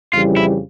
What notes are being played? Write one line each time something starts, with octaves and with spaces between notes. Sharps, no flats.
F2 C#3 E3 G3 F4
E4